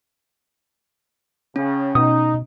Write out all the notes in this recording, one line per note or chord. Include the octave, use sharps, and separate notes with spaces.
C#3 C#4
B2 D#4 D#6